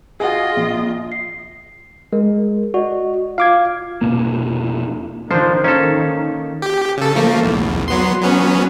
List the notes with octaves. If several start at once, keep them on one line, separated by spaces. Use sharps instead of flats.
F4 F#4 G#4 D#5
A#1
C7
G#3 A#4
F#4 D5 D#5
F4 F5 D6 G#6
F1 B2 A#3
D#3 F3 D4 C5
A#3 C#4 A4
G4
C#3 A4
F3 A3 A#3
B1 E2
F#3 B3 C6
F#3 B3 C#4